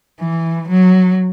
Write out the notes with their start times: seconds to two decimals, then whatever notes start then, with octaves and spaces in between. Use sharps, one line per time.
0.20 E3
0.69 F#3